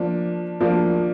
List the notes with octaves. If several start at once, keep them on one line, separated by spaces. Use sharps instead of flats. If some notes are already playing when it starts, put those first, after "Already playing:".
Already playing: F3 A#3 D4
F3 A#3 D4